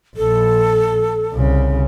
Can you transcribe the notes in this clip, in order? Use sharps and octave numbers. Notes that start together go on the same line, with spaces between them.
A#1 A4
C2 C#3